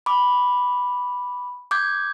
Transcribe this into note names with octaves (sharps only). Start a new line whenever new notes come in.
B5 D6
D6 G6 G#6